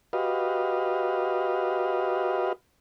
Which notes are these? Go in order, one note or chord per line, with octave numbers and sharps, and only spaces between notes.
F#4 G4 B4 D#5 F5